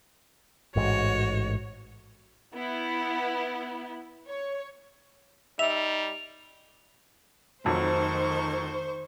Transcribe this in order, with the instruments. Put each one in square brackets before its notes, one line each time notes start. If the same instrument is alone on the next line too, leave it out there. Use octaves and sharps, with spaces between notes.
[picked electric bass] A1 G#2 [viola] F#4 C#5
[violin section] B3 E4
C#5
[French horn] G3 [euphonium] D#4 [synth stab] E5 [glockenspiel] F7
[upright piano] F1 F2 F#3 [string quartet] D#3 C#6 [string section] C5